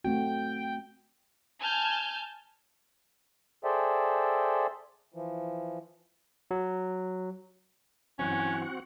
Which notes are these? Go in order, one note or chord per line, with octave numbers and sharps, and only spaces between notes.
A3 C4 F#4 G5
G#5 A5 F6 G6 G#6
G#4 A4 C5 D5 E5 G5
E3 F3
F#3
G2 E3 F#3 C4 C#4 F#4 F#5